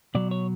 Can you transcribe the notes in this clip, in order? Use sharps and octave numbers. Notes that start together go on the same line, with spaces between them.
B2 F#3 D5
C#5